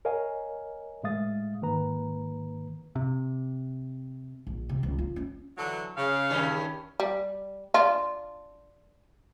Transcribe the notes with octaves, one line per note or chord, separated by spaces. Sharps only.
A#4 C#5 D#5 F5 G#5
A2 G#3 E5 F5 D#6 A6
G#2 D#3 A#3 B4 A#5
C3
A#1
C3
C#2
F4
C#4
D3 E3 F#3
C#3 F5
G2 D#3 C#4
G3
D4 F4